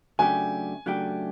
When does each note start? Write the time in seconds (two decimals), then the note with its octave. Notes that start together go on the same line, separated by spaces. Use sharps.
0.19 C#3 F#3 A3 D4 G4 G#5
0.86 C#3 F#3 A3 D4 G4